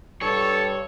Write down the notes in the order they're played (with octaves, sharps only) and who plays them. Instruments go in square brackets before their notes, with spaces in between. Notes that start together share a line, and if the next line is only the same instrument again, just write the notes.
[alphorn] G2 [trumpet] A4 [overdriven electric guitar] C#5